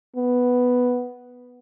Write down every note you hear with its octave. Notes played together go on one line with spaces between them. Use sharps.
B3